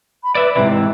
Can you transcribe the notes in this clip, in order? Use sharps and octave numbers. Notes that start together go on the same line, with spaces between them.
B5
B4 D5 E5
G#2 C3 E3 E4